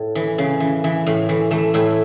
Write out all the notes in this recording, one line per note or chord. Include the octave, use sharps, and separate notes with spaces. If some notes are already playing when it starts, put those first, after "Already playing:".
Already playing: A2
E3
C#3
E3
E3
A2
E3
E3 A3
A2 E4